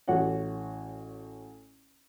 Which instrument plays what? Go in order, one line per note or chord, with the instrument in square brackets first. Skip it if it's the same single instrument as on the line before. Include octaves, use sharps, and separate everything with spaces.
[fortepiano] A1 F#4 C#5 F#5